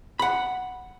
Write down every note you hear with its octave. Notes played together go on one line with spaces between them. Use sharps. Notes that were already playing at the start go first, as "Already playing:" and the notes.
F#5 B5